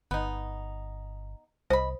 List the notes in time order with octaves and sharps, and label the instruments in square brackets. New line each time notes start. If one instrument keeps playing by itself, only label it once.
[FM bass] G1 [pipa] B3 D#4
[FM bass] C2 [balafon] C5 [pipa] D#5 B5